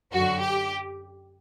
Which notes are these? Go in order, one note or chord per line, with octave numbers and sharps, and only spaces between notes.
F#2 D3 F#4
G4